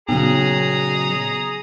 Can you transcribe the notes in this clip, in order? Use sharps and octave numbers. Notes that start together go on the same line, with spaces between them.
A#2 C#3 F#3 B3 G#4 A#5 D#6